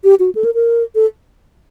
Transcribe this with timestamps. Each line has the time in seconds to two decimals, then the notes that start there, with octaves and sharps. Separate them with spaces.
0.04 G4
0.19 F#4
0.35 A4
0.44 A#4
0.54 A#4
0.95 A4